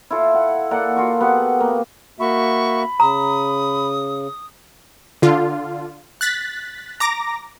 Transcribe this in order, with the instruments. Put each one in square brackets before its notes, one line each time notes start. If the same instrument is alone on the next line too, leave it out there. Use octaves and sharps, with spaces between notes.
[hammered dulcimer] E4 F4 A4
F#5
A#3 A4 D5 F#5
F4 F#4 C#6
B3 G4 F#5
A#3 B4
[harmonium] A#3 F#4 E5 [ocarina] B5 [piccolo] C#6
[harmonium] C#3 [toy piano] A#5 [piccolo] D#6
[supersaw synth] D3 F4
F#6 A6 B6
A#5 D6 A#6